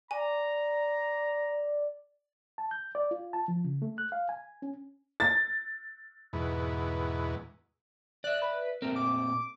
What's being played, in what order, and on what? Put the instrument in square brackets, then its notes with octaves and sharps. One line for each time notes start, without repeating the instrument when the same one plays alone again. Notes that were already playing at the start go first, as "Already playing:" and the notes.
[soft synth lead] D5 [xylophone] G#5 [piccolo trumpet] A#5
[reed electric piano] A5
G6
D5
F4
A5
F3
C#3
A3
F#6
F5
G#5
C#4
[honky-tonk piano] A6
[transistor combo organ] E2 G#2 B2
[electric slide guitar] D5 E5 [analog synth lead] F#6
[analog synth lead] B4
[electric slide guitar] A#2 A3 C4 [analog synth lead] A#4
[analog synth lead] D6